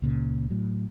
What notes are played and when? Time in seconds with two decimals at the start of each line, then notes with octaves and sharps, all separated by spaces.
0.02 C#2 A#2 C#3
0.50 A2 F#3